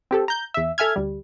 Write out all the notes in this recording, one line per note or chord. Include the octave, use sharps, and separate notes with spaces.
C4 G4 A4
A#5 G6
E2 E5
A4 E5 G#5 F6 G#6
D2 G3